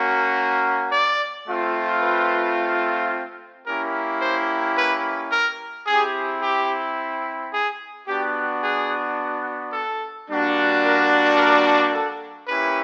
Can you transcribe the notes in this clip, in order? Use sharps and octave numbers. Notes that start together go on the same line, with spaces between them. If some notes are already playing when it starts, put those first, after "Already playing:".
Already playing: A#3 C#4 F#4
D5
A3 C4 F4
B4
A#3 C#4 E4 G4 A#4
C5
B4
A#4
C4 E4 G4 G#4
G4
G#4
B3 D4 F#4 G4
G#4
A4
G3 A#3 D4 F#4
A#4
A#4
A4
A#3 C#4 E4 G4 B4